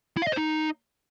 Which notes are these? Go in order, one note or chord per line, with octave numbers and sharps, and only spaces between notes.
E4
F5
D#5
C5
D#4